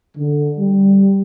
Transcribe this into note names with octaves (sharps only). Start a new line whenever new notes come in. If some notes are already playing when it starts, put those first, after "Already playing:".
D3
G3